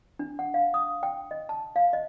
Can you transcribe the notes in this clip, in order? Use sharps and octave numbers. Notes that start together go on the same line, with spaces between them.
D4
F#5
F5
D#6
G5
D#5
A5
F5
D#5